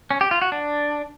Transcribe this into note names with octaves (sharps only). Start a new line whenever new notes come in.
C#4
G4
F4
F#4
D4